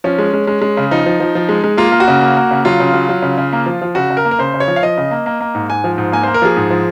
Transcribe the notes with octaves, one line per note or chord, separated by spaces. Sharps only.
F3 C#4
G#3
G#3
G#3
G#3
C#3
F3 D#4
F3
F3
F3
G#3
G#3
A#3 F4
A#3
F#4
C#3
A#3
A#3
C#3
F#3 F4
C#3
F#3
F#3
C#3
C#3
A#3
F3
F3
C#3 F#4
C#3
A#4
A#3
A#4
C#3 C5
C#3
C#5
F3
F5
F3 D#5
C#3
A#3
A#3
A#3
G#2
G#2 G#5
F3
G#2
A#3 G#5
A#3 C5
A#4
F3 G#4
G#2
F3